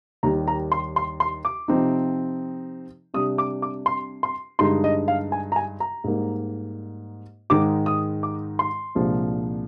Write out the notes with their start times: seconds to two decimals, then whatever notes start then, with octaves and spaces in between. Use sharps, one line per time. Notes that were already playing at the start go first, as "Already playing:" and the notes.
0.23 D#2 D#3 G3 A#5
0.48 A#5
0.72 C6
0.96 C6
1.20 C6
1.45 D6
1.68 C3 F3 C4 D#4
3.14 C3 G3 D4 D#6
3.38 D6
3.62 D6
3.86 C6
4.23 C6
4.59 G2 D3 G#3 D#4 C6
4.84 D#5
5.08 F5
5.32 G#5
5.52 A#5
5.56 G#5
5.80 A#5
6.04 G#2 G3 A#3 D#4
7.50 G#2 D#3 G#3 D#4 D6
7.86 D#6
8.23 D6
8.59 C6
8.95 C2 A#2 F3 G#3 D4